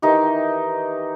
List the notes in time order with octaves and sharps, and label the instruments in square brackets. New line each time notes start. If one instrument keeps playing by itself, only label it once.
[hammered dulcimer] D#3 E3 D#4 G4